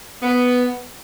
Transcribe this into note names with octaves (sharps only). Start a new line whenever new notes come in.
B3